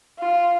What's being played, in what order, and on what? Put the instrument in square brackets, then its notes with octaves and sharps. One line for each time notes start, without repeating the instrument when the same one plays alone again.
[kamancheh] F4